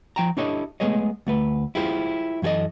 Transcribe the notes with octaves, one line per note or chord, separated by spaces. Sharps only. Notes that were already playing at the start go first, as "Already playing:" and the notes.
F3 G5 A#5
D4 E4 G4 A4 C#5 D#5
G#3 A3 B3 G#4 C#5 D#5
D2 A3 B4
E4 F4 G4 G#4 C5
F#2 E3 G#4 A4 D#5